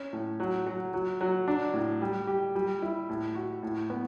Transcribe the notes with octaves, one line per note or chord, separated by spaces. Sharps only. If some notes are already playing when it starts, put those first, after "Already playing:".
Already playing: C#4
A2
F#3
F#3
F#3
F#3
D4
A2
G3
G4
G3
E4
A2
F#4
A2
B3